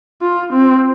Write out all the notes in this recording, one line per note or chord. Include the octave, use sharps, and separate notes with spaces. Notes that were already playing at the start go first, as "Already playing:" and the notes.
F4
C4